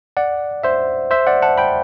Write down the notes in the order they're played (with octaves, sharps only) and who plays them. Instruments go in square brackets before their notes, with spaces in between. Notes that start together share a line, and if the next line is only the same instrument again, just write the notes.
[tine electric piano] D5 F#5
C5 E5
C5 E5
D5 F#5
F#5 A5
G5 B5